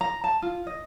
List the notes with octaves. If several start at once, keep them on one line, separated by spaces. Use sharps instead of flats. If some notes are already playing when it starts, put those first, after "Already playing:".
A#5
A5
F4
D#5